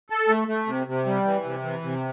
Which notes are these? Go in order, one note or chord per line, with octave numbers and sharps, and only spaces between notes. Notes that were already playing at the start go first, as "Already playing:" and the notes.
A4
A3
A3
C3
C3
G3
E3
C3
E3
C3